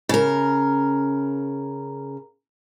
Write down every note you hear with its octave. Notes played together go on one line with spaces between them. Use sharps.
C#3 A#4